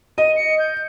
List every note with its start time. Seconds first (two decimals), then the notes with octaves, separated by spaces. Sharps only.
0.18 D#5 D#7
0.36 C#7
0.59 G6